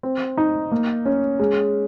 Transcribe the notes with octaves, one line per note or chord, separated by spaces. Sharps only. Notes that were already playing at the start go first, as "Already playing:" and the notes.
C4
D#4
A#3
C#4
G#3